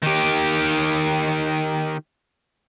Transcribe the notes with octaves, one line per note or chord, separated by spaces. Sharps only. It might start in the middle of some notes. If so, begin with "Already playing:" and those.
D#3 G4